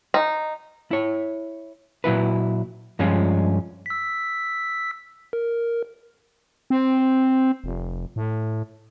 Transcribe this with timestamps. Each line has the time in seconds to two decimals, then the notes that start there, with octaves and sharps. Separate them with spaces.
0.14 D#4
0.91 E4 C#5
2.04 A#2 F#3 E4 B4
2.99 G2 F3 G#3 C#4 F4
3.86 E6 B6
5.33 A#4
6.70 C4
7.64 F1
8.16 A2